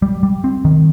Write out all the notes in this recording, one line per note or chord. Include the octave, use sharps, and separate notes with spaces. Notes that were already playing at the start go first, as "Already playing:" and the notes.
G3
G3
C4
D#3